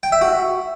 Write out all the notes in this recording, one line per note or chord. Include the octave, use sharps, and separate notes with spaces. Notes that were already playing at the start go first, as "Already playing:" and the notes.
G5
E5
F#4